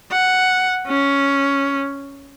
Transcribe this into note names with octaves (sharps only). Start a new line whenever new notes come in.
F#5
C#4